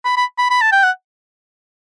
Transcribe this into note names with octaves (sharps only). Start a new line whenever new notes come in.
B5
B5
B5
B5
A5
G5
F#5